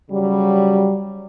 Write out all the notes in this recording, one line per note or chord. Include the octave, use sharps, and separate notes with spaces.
C#3 F#3 G3